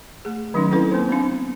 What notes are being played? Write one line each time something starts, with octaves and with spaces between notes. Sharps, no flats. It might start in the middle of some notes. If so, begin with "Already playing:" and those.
A3 G#4
D#3 F#3 G3 C#4 D#4
C4 C#4 E4 A4 B4
A#3 C4 D#4 C5
B3 C4 D4